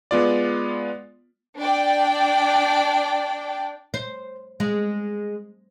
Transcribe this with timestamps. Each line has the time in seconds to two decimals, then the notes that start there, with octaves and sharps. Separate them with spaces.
0.11 G#3 B3 F4 D5
1.57 D4 D5 G5
3.94 C5
4.60 G#3